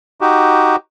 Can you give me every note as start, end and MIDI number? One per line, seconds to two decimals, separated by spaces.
0.21 0.76 63
0.21 0.76 66
0.21 0.76 67